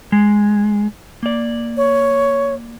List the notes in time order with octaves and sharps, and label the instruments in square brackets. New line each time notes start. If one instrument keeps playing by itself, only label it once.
[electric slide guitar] G#3
A#3 D5
[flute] C#5